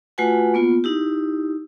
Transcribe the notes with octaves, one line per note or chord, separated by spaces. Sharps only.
A3 F4 F#4 B4 F#5 G#5
A#3 B3 F4
D#4 E4 G4